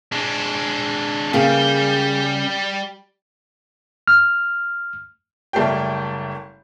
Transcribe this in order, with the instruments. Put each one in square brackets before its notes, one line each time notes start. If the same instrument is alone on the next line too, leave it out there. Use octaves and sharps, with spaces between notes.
[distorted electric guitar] G#3 D4
[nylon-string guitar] C#3 A#3 G#4 [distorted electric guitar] G3 G4
[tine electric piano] F6
[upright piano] F#1 G3 A3 A#3 G4 G5